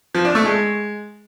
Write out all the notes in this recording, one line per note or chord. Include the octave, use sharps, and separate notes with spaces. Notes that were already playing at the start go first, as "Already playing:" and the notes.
F3
D4
A3
G#3